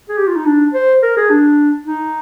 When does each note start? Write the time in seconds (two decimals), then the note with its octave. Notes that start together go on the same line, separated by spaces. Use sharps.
0.09 G#4
0.18 G4
0.28 F4
0.36 D#4
0.46 D4
0.74 C5
1.03 A#4
1.17 G#4
1.30 D4
1.87 D#4